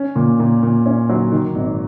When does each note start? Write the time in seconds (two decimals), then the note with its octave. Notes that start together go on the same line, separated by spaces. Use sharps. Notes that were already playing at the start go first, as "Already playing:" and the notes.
Already playing: C#4
0.16 A#2
0.40 A#2
0.63 A#2
0.86 C#4
1.09 F#3
1.32 D#3
1.56 G#1